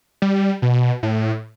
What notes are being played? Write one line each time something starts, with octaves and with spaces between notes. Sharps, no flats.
G3
B2
A2